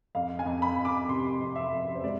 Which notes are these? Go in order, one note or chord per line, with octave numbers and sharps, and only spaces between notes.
F2 F5
G#5
F2
B5
F2
D6
C3 C6
F2
E5
F2
C5
G#3 D5